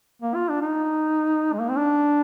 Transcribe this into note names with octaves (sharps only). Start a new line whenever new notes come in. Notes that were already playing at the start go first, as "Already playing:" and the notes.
A#3
F4
D4
D#4
G#3
A#3
C4
D4